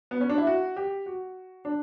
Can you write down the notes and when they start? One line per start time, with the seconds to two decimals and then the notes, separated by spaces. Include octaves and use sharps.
0.11 B3
0.20 C#4
0.29 D4
0.38 E4
0.47 F#4
0.76 G4
1.06 F#4
1.65 D4